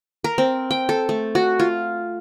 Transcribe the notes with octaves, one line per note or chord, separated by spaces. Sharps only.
A#4
C4
G5
A4
A3
F#4
F4